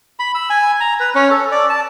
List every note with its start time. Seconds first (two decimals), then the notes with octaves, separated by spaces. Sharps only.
0.19 B5
0.35 E6
0.50 G#5
0.80 A#5
1.00 B4
1.15 C#4
1.31 A4
1.51 D5
1.69 A5